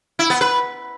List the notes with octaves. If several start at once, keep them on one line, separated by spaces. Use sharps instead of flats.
E4
B3
B4